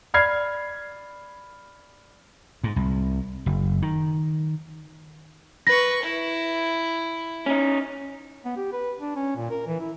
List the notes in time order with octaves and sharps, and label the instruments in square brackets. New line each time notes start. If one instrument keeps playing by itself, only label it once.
[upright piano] D5 B5 F6 G#6 C7
[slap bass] G#2
C2
F#1
D#3
[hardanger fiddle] B4 C#6 [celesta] A#6
[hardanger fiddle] E4
[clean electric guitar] C#4 D#4
[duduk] B3
G4
B4
D4
C#4
A#2
A#4
E3
E4